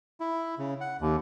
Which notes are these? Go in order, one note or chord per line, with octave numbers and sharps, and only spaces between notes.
E4
C#3
F#5
D#2